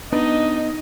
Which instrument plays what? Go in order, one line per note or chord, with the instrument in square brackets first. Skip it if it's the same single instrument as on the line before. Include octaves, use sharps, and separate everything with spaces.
[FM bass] B3 [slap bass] D4 [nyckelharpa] D#4 [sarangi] D#5